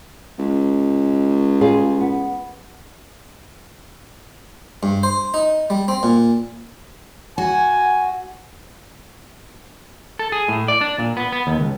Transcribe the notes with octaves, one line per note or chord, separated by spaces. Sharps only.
C#2
G3 F4 G#4
B3
G2
C5
D#4
G3
C4
A#2
F#4 G#5
A4
G#4
A2
D5
D4
A#2
B3
B3
D#2
C#2